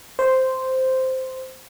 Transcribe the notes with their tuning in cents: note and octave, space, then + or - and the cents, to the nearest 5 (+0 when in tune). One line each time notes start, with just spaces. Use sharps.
C5 -5